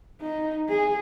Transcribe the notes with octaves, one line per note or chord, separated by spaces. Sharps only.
D#4
G#4